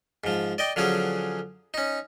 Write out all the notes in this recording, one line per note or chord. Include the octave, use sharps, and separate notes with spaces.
G#2 F3
D5 D#5 G5
D3 F3 F#3 C#4 G#4
C#4 D#4